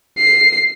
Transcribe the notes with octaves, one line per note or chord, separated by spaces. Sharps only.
C7